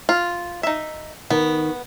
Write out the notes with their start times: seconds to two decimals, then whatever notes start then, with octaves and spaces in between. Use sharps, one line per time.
0.09 F4
0.63 D#4 E5
1.30 D#3 B3